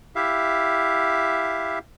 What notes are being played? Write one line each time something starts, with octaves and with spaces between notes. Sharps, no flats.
E4 G4 E5 F5